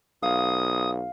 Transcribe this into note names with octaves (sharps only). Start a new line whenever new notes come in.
B1 F5 D#6